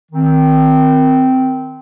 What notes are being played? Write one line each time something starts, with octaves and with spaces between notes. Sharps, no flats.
D#3 C4